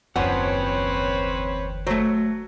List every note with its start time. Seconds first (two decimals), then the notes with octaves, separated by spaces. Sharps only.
0.16 F#1 D#2 F3 C4 C#4 B4 C#5 F#5
1.87 F#3 A3 C5